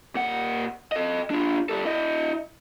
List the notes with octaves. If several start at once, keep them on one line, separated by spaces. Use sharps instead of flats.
A#2 F#5
A4 D#5
D4 F4
G3 A4
E4 D#5